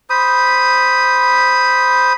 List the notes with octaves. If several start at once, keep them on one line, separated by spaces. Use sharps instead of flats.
C5 B5 D#6